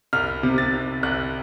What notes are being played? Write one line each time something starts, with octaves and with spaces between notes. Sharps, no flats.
C2 F6
C3
A6
C3
C2 F#6